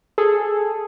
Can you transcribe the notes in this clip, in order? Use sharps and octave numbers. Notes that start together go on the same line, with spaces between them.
G#4 A4